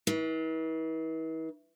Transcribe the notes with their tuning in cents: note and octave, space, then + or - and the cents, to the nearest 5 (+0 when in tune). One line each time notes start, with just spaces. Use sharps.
E3 -45